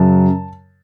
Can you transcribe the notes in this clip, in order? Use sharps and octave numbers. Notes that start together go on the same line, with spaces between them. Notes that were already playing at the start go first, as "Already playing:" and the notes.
Already playing: F#2 C#3 F#3 A5